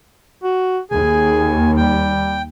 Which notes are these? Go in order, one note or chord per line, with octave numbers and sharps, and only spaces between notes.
F#4
D#2 G#4 G#5
G3 G5